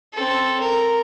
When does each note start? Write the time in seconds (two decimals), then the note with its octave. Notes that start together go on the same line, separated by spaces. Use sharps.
0.14 C4 A4
0.60 A#4